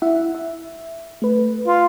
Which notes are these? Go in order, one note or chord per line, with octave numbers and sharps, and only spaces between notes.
E4 E5 F#5
E5
A3 B4
F4